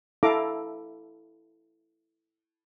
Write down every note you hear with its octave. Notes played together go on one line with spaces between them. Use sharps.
E4 A4 F5 A#5 D6